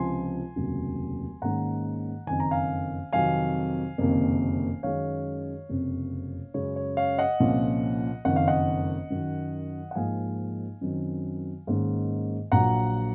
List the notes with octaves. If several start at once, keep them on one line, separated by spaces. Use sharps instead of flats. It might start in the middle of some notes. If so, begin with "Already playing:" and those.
Already playing: C#2 C3 F3 G#5 C6
F1 D#2 C#3 F#3
G#2 D#3 A#3 C#4 F#5 A#5
F#1 F2 D#3 G#5
A#5
F5 G#5
F2 C3 D#3 F#3 F5 G#5
F#1 F2 C3 D#3 A#3
F#2 D#3 G#3 C#4 C#5 F5
F#1 F2 C3
F#2 C#3 G#3 C#5
C#5
C#5 F5
D#5 F#5
C2 A#2 F3 A#3 C#4
F#1 F2 D#3 F#5
F5
D#5 F#5
F#2 D#3 F#3
F#5
G#2 F3 A#3 D#4 F5 G#5
F#2 D#3 F#3 C4
G#2 D#3 A#3 C#4
A#1 A#2 F#3 F#5 A#5